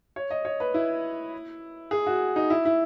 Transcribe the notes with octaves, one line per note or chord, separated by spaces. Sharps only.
C#5
D#5
C#5
B4
E4
G#4
F#4
D#4
E4
E4